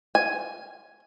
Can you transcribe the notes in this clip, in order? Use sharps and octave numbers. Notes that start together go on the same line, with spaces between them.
G#5